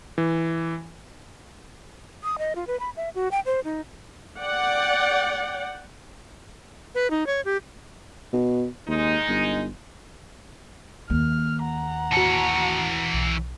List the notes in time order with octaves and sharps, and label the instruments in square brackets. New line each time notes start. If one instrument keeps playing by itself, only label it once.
[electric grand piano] E3
[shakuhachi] D#6
D#5
F4
B4
B5
E5
F#4
G5
C5
D#4
[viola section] D5 F#5 G5
[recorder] B4
D#4
C#5
G4
[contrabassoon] B2
[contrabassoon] D#2 [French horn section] G#3 D#4
[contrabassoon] G1
[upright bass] D#2 A#3 [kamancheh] F6
[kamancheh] F#5 A#5
[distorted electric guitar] E3 C#5 [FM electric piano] F#4 A5
[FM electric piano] B1